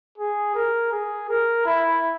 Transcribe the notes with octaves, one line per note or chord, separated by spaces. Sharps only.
G#4
A#4
G#4
A#4
E4